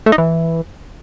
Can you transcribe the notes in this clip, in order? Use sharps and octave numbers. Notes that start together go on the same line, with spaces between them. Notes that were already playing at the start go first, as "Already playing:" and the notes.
A3
D#4
E3